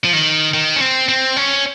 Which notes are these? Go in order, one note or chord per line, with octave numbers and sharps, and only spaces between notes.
F3
D#3
D#3
C#4
C4
C4
C#4